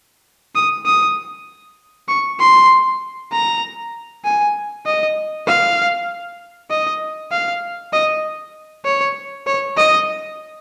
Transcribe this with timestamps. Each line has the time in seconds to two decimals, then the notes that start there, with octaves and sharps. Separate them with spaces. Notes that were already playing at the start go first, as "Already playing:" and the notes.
0.55 D#6
0.86 D#6
2.08 C#6
2.40 C6
3.32 A#5
4.25 G#5
4.86 D#5
5.47 F5
6.71 D#5
7.31 F5
7.93 D#5
8.85 C#5
9.47 C#5
9.77 D#5